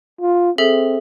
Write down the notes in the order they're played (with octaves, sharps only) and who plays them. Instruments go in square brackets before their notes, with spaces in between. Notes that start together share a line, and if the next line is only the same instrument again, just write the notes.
[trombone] F4
[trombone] C4 [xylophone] G#4 A4 E5